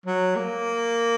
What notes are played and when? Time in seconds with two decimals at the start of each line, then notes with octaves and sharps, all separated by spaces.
0.06 F#3
0.36 A#3